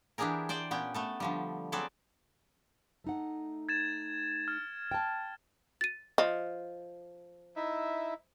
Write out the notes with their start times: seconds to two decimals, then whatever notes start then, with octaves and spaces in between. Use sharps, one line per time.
0.18 E3 B3 D4 G4 G#4 A#4
0.49 C5 D5 G5
0.71 A#2 B3 C#4 G5
0.94 A3 B3 A4
1.20 D3 F3 G3
1.72 F#3 C4 G#4 A4 B4 D5
3.04 A3 D#4 F#5
3.69 G#6 A6 E7
4.48 F6
4.91 G5 A5
5.81 A6 D#7
6.18 F3 D#5
7.56 D#4 E4 E5